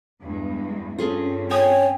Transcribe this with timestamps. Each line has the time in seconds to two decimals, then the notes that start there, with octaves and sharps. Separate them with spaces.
0.23 E2 G2 G#3
0.98 G2 C4 C#4 F4 G#4 A4
1.51 C#5 G5 G#5 D#6